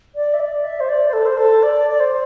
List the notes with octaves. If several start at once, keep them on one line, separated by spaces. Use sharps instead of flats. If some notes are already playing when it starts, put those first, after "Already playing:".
D5
E5
D5
E5
C5
D5
C5
A4
C5
A4
D5
D5
C5